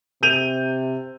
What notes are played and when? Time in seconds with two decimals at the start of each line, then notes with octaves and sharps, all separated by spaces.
0.23 C3 G6 D#7 F7